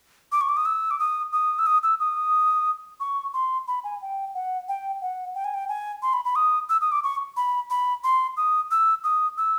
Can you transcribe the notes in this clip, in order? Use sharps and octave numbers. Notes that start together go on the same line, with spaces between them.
D6
C#6
D6
D#6
E6
D6
D#6
D#6
E6
D#6
E6
D#6
C#6
C6
B5
G#5
G5
F#5
G5
F#5
G5
G#5
G5
G#5
C6
B5
B5
D#6
E6
D#6
D6
C#6
B5
B5
C6
D#6
E6
D#6
E6